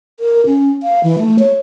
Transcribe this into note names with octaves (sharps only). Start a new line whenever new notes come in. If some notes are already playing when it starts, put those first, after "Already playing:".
A#4
C#4
F5
E3
A3
C#5